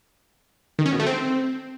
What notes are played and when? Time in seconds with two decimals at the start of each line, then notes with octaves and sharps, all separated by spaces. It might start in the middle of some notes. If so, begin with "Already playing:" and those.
0.79 D#3
0.86 C#4
0.93 B2
1.00 A3
1.07 C4